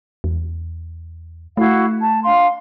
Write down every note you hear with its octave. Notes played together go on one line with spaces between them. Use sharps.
E2
A3 E4 F#4 F5
A5
D4 F5 C6